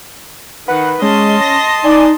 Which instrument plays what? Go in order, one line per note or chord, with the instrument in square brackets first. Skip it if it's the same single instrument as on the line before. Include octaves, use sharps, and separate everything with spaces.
[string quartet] D#3 [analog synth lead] B4 [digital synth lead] F#5
[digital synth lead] G#3 [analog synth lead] C#4 [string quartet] D#5 A5 C6
[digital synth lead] A#6
[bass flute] D#4 [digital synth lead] D5 [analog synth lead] G#5